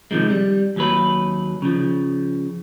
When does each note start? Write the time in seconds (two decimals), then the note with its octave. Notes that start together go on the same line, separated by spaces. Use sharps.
0.11 C3 D#3 F3 G#3
0.30 G3
0.76 D#2 F#3 B4
1.62 C#3 F3